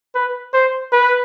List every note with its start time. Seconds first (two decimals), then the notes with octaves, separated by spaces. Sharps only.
0.15 B4
0.54 C5
0.92 B4